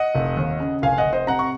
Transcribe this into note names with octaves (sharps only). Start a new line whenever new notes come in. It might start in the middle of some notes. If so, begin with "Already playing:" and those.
Already playing: D#5 F#5
F1
D#2
C#3
F1 F5 G#5
D#5 F#5
F1
C5 D#5
C3 F#5 A#5
C#6